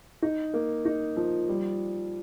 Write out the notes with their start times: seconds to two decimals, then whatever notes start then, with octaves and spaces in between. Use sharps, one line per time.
0.22 D#4
0.54 A#3
0.85 D#4
1.16 F3
1.49 G3